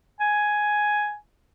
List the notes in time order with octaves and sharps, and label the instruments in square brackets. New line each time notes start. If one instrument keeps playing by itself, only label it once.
[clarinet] G#5